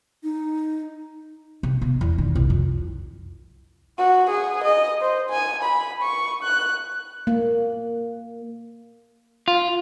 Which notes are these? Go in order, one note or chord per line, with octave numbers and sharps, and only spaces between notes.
D#4
C3
B2
E2
D#3
C2
F2
F#4
G#4
D#5
C5
G#5
B5
C#6
F#6
A#3
F4